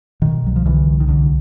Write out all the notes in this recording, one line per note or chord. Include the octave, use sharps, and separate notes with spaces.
B2 D#3
C2 F#3
F3
C2 D3 E3
C2
D#3
D2 D3